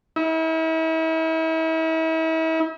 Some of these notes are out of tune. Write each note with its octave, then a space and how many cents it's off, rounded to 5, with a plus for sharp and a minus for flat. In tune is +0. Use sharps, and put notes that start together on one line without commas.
E4 -40